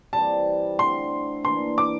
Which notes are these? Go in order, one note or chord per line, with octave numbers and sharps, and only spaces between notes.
C3 E3 G3 A5
D3 A3 C4 E4 C6
E3 A#3 D4 C6
D6